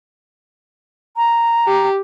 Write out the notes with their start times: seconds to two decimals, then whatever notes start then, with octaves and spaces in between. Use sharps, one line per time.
1.17 A#5
1.67 G4